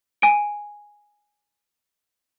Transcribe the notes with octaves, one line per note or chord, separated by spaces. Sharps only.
G#5 D7